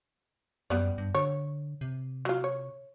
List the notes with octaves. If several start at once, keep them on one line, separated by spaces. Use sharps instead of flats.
F#2 G3 B3 D5
G2
D3 C#5
C3
F#3 F4
C#5